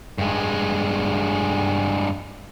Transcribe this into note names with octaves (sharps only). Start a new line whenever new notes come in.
G2 G#3